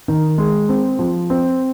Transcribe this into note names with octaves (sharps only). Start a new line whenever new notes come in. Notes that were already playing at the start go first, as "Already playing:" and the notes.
D#3
G#3
C4
F3
C4